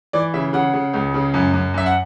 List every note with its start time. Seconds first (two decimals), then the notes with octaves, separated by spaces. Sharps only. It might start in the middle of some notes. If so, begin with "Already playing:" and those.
0.13 E3 D5
0.34 C#3 E5
0.53 C#3 F#5
0.73 C#3
0.93 C#2
1.14 C#3
1.34 F#2
1.53 F#2
1.74 F#2 E5
1.86 F#5